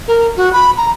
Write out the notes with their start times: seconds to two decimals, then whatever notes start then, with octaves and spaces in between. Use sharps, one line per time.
0.08 A#4
0.37 F#4
0.53 B5
0.78 A#5